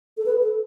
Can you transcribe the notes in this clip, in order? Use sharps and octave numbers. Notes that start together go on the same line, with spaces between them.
A4
B4
A4